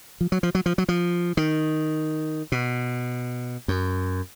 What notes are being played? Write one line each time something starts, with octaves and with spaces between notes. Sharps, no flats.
F3
F#3
F3
F#3
F3
F#3
F3
D#3
B2
F#2